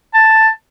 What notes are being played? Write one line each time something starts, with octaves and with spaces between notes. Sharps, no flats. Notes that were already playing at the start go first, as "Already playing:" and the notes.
A5